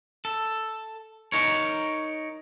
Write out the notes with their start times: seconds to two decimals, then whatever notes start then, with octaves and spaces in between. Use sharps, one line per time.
0.25 A4
1.32 D#4 A#4 C#5